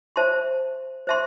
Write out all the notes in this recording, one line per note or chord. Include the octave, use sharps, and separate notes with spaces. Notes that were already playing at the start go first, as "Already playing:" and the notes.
C5 E5 A5 C6
C5 E5 A5 C6